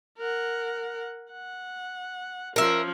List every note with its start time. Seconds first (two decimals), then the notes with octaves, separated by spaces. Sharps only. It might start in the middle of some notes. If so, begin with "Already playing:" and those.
0.18 A#4 F#5
1.32 F#5
2.56 F3 C#4 A#4 E5